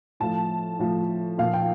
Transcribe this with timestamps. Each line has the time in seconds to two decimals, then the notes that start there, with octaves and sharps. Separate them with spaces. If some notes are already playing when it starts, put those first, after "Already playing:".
0.20 A2 F3 A5
0.79 A2 F3
1.38 A#2 F3 F5
1.54 G5